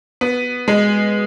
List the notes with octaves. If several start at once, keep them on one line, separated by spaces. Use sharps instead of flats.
B3
G#3